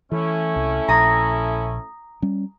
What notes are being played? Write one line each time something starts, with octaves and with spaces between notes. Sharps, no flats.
E3 A3 C#4 E4
C2
A#1 A#5 D#6
G3 C#4